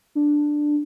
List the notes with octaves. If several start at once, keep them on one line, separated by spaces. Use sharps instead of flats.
D4